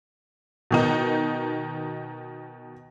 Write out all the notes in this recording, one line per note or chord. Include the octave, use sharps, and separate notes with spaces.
B2 D#3 D#4